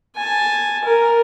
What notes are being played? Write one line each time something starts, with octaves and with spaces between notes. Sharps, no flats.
G#5 A5
A#4